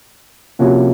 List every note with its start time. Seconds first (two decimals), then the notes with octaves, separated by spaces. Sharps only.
0.59 C3 F3 A#3 C#4 F#4